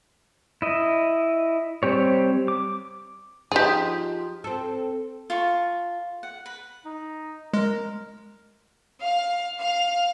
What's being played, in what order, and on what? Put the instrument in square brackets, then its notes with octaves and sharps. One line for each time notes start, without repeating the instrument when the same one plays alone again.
[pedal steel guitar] E4 D#5
G3 C4 G4 C#5
D6
[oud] F3 D#4 F4 [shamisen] G4 G#4
[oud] C4 A4
[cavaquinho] F4 A4 C#6
F#5
B4
[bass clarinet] D#4
[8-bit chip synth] G#3 [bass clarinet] A#4
[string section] F5
F5